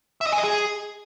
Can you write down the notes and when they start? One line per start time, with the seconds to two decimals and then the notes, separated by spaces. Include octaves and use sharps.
0.21 E5
0.27 D#5
0.32 G#5
0.38 D#5
0.44 G#4